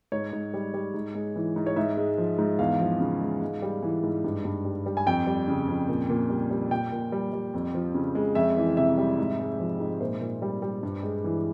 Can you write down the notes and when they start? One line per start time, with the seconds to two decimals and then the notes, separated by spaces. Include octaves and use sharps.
0.12 G#2 C#5
0.33 G#2
0.54 G3
0.74 G3
0.94 G#2
1.15 G#3
1.36 E3
1.56 G#2
1.66 C#5
1.76 G#2 E5
1.97 G#3
2.18 F3
2.38 G#2
2.59 E2 F5
2.79 F3
3.00 C#3
3.21 G#3
3.42 G#2
3.62 G3
3.82 E3
4.03 G#2
4.24 G2
4.45 G2
4.65 G3
4.86 G3
4.97 G#5
5.06 F2 G5
5.27 G3
5.48 C#3
5.68 F2
5.89 A#2
6.10 A#2
6.30 G3
6.51 G3
6.71 A#2 G5
6.92 A#2
7.12 G3
7.33 G3
7.54 F2
7.74 F3
7.94 C#3
8.15 G#3
8.35 F2 E5
8.56 E3
8.77 C3 E5
8.98 G3
9.18 G#2
9.39 G#3
9.60 F3
9.80 G#2
10.00 A#2 C5
10.21 A#2
10.42 G3
10.62 G3
10.83 G2
11.03 G#3
11.24 E3